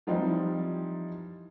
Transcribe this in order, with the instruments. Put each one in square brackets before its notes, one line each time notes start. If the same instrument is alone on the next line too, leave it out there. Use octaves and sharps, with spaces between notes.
[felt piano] E3 F3 G3 C4 D#4